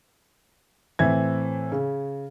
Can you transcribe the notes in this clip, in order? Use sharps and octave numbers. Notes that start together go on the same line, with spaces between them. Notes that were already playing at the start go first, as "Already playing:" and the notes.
A2 E3 C4 E5 G#6
C#3